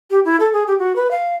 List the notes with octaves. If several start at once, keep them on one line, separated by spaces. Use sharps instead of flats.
G4
E4
A4
G#4
G4
F#4
B4
F5